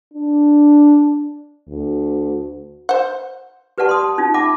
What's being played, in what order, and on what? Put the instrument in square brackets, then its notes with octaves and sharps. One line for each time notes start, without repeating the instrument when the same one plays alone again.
[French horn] D4
D2
[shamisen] C5 F#5
[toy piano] G4 B4 D5 F#5 A5 C#6
C6 D#6
A5
C#4 D#4 F4
E5 F#5 A5 B5 D6